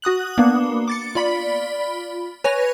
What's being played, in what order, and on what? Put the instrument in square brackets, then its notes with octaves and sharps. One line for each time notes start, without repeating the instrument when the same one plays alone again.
[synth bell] F#4 D#6 F#6 F#7
A#3 B3 D4
D6 A6 C#7
F4 D5 B5 B6
B4 C#5 G#5 A#6 F7